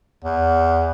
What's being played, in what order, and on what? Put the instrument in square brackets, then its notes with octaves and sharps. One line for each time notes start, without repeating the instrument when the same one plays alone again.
[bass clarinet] E2